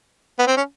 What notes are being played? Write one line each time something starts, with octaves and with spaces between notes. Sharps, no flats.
B3
C4
C#4